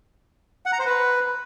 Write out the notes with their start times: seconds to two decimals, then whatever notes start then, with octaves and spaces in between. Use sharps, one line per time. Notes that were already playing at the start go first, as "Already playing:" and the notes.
0.66 F#5
0.73 A#5
0.79 C5
0.86 B4